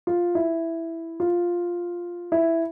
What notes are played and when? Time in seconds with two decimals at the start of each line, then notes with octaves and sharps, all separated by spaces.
0.07 F4
0.35 E4
1.20 F4
2.32 E4